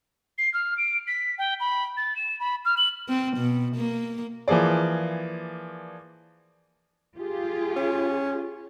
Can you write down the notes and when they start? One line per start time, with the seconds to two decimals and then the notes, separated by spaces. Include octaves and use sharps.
0.38 C7
0.54 F6
0.78 D7
1.07 B6
1.38 G5
1.60 B5
1.97 A6
2.16 E7
2.40 B5
2.65 F6
2.77 F#7
3.09 C4
3.37 B2
3.76 A#3
4.48 E3 F3 A#3 G#4 D5
7.17 F4 G4 G#4
7.76 C#4